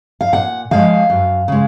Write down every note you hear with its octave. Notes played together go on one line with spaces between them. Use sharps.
F5
A#2 F#5
F3 G#3 F5
F#2
C#3 G#3